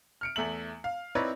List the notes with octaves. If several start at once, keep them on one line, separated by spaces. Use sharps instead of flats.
F6 C#7 D7
E2 A3 E5 F#7
F5
C4 D#4 E4 B4 C#5 D5